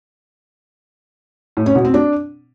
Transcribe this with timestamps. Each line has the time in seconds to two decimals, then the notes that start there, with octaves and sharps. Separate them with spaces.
1.57 A2
1.66 C#4
1.75 B2
1.85 C4
1.94 D4